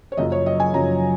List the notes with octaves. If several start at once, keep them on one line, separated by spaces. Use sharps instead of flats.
C#5
F#1 F#2 C#3 F3 D#5
C#5
D#5
G#5
F#1 F#2 C#3 F3 A#5